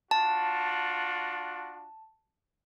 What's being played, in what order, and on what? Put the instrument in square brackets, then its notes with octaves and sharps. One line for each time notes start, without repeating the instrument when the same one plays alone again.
[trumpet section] D4 F4 F#4 [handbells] A5